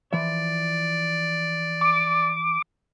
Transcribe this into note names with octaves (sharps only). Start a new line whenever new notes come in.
E3 F3 D5 E5
D6